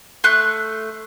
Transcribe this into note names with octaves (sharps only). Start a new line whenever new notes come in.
A3 C6 F#6